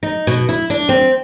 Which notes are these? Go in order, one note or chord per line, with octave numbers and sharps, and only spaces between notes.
D#4
B2
E4
D4
C4